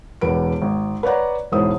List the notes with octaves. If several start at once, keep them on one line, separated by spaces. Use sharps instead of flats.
E1 E2 B4 D7
G#1
B4 C#5 D5 F#5 A#5
E1 G#2 E4 C5 D#6